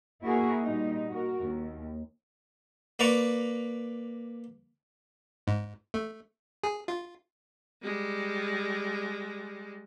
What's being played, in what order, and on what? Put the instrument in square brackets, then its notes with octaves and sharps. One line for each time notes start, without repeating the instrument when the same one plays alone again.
[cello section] A#3 E4 F#4 G#4 A#4
A#2 G3 D#4
F#4 A#4
D#2
[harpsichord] A#3 B4 D5 A#5 C#6
[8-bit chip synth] G#2
A3
G#4
F4
[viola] G3 G#3